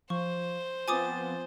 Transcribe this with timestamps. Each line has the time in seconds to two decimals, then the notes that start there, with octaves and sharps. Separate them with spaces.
0.10 F3 C5 C#6
0.88 F3 B3 C4 G#5 D6 D#6 A6